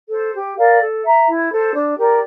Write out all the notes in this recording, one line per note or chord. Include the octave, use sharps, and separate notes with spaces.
A4 C5
G4
A#4 D5 F5
A4
E5 A#5
E4
A4 C5
D4
G4 A#4 D5